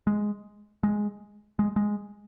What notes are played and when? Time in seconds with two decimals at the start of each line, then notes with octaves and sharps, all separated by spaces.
0.07 G#3
0.83 G#3
1.59 G#3
1.76 G#3